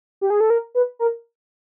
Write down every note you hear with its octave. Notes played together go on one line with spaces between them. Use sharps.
G4
G#4
A4
A#4
B4
A#4